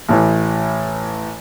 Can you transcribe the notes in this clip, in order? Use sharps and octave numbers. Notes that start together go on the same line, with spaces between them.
A1 A2 E3